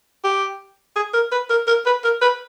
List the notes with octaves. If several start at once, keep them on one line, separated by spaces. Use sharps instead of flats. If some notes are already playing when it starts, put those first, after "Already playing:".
G4
G#4
A#4
B4
A#4
A#4
B4
A#4
B4